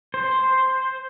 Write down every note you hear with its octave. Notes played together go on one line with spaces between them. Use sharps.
C5